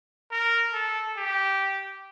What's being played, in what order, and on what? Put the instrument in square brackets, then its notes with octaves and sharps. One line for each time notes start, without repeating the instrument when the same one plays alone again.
[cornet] A#4
A4
G4